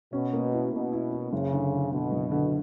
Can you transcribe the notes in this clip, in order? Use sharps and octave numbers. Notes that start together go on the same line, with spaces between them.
B2 C#4
A#3
E4
B2 A#3
E4
E4
F#1 C#3
D3
D3
B2 D3
F#1
D3